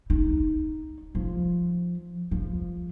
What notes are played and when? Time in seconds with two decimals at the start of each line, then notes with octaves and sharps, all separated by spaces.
0.10 D#4
1.15 F3
2.31 F3